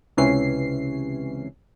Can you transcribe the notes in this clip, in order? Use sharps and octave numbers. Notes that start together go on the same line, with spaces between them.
C#2 C3 E3 C#4 C7